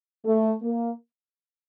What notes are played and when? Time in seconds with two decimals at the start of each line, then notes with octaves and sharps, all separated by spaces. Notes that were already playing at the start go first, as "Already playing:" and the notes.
0.25 A3
0.63 A#3